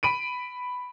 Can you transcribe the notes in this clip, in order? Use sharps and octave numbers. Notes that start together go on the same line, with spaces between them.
B5 D7 D#7